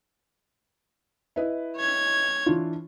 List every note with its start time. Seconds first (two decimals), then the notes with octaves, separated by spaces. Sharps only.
1.36 E4 B4 D#5
1.77 C#5 G#6
2.46 E3 D4 F4